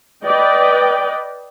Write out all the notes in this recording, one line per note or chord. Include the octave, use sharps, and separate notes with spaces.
B4 D5 D#5 G5